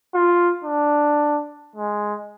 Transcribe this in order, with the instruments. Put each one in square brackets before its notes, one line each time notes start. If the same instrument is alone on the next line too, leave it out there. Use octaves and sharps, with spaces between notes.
[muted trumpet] F4
D4
G#3